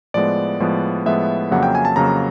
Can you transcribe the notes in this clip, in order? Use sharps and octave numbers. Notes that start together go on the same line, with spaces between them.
A2 F3 G#3 B3 D5
A2 F3 G#3 B3
A2 F3 G#3 B3 E5
F2 C#3 F#3 A#3 F#5
G5
G#5
A5
F2 C#3 F#3 A#3 A#5